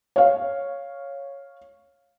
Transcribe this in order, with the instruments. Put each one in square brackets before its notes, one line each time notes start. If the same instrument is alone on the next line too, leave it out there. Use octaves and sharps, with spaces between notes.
[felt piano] C#5 F5